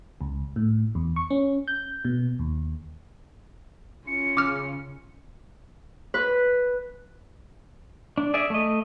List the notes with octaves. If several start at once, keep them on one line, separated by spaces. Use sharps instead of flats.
C#2
A2
E2
C#6
C#4
G6
B2
D#2
C#4 F4 C#7
C#3 D6 E6 F6
B4
D4
G#4 D5 E5
A3 D#5